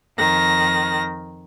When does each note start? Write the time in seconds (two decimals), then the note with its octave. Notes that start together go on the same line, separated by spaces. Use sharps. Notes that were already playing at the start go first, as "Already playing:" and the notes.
0.17 F2 D#3 A#6